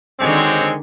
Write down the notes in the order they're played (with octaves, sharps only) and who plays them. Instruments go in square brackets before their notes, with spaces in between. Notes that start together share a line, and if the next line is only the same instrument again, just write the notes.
[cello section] D3 D#3 D4 [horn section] G#3 C4 [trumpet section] F#4 G4 C#5